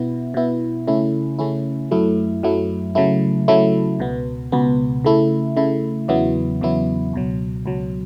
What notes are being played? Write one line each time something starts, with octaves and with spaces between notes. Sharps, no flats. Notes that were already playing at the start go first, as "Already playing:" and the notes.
Already playing: B2 B3 E4
B2 B3 E4
C#3 A3 C#4 E4
C#3 A3 C#4 E4
F#2 F#3 A3 E4
F#2 F#3 A3 E4
C#3 F#3 A3 E4
C#3 F#3 A3 E4
C#2 B2 B3
C#2 B2 B3
C#3 A3 E4
C#3 A3 E4
E2 C#3 F#3 B3 E4
E2 C#3 F#3 B3 E4
C#2 B2 F#3
C#2 B2 F#3